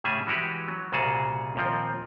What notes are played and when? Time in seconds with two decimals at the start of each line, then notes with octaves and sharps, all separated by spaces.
0.04 A2 C#3 G3 G#4 E5 G#5
0.27 E3 G#3 F#4 G4 B4
0.68 F#3
0.92 C2 A#2 C#3 F#4 G#4 A5
1.56 D#2 A#2 F3 C4